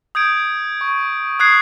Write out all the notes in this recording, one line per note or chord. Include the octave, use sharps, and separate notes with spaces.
D#6 G6 G#6 D7
C#6
D#6 F#6 G#6 C7